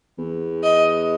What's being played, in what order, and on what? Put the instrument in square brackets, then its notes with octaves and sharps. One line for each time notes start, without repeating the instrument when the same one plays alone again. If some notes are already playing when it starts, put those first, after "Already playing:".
[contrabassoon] E2
[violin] D#5